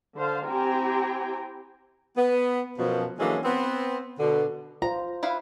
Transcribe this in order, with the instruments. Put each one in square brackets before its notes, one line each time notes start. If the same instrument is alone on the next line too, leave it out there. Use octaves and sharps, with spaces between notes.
[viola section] D3 C5 F5 A5
C4 E4 G4 G5 G#5 A#5
[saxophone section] B3
F#2 B2 F3
D3 E3 F#3 G#3 A#3 C#4
B3 C4
B2 D3
[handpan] F4 C5 [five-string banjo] A#5
[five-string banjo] E4 B4 F5